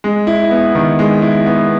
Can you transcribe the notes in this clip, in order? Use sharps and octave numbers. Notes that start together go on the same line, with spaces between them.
G#3
E4
B3
D#3
G#3
E4
B3